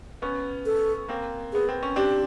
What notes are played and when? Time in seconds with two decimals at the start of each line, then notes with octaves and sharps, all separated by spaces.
0.22 B3 C#4
0.66 A4
1.09 A#3 C4
1.53 B3 G#4
1.69 C4
1.83 C#4
1.96 C4 D4 G4